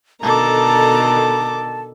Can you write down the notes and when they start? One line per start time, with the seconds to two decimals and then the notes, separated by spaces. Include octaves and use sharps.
0.23 B2 D3 D#3 A4 A5 A#5 D6